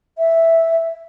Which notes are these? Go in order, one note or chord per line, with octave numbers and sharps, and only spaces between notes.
E5